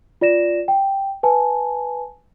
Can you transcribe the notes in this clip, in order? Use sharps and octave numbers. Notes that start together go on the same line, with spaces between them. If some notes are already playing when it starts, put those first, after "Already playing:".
F4 D5 A#6 E7
G5
B4 G#5 A5